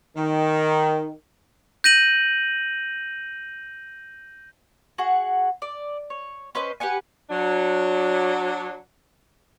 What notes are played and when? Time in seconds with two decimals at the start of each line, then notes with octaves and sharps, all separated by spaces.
0.17 D#3
1.84 G6 A#6 D#7 F#7
4.98 F#4 G#4 F#5
5.62 D5
6.10 C#5
6.55 C#4 B4 C5 D#5
6.80 G4 B4 F#5 G#5
7.29 F#3 D4